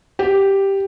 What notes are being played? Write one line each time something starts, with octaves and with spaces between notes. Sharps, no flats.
G4